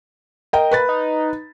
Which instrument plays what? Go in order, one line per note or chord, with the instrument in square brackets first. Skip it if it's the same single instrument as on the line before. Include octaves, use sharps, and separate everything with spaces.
[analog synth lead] A#3 [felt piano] D#5 G5
[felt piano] B4 B5 A6
[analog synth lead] D#4